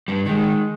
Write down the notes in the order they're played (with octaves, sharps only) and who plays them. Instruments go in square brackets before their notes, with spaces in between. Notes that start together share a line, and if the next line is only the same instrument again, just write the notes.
[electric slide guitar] G2 G3
[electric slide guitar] D#3 [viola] G#3